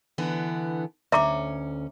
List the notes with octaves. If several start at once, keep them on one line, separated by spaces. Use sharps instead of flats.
D3 E3 B3
D2 C#4 E5 A#5 D6